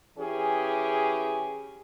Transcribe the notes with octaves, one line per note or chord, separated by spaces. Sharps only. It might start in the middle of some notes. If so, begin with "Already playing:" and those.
E3 C#4 G4 G#4